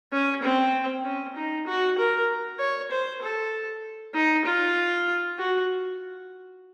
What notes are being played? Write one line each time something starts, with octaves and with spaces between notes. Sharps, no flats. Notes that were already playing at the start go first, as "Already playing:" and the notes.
C#4
C4
C#4
D#4
F#4
A#4
C#5
C5
A4
D#4
F4
F#4